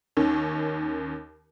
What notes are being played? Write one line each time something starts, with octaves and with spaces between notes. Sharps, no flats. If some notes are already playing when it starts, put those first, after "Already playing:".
D#2 D#3 C#4